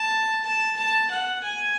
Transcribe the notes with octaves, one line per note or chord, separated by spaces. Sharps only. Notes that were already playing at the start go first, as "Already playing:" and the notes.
Already playing: A5
A5
A5
F#5
G#5